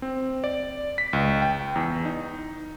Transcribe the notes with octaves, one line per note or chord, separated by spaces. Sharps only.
C4
D5
B6
C#2
G5
E2
D#4